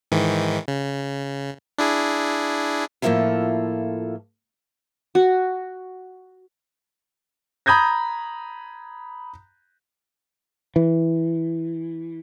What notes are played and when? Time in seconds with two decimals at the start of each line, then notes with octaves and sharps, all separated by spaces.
0.12 G#2 D#3 E3
0.68 C#3
1.78 D4 E4 G#4
3.02 A2 F3 A#3 E4 F4 A4
5.15 F#4
7.66 A#5 B5 D#6 G6 G#6 A#6
10.76 E3